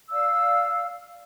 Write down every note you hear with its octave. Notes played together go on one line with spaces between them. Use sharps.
D5 F5 E6